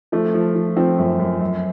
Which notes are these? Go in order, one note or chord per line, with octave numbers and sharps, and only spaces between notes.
F3 A3
F3
F3
F3 C4
F#2
F#2
F#2